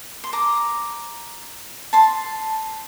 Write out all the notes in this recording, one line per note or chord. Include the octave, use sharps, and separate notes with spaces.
C6
A#5 D6
A5 C6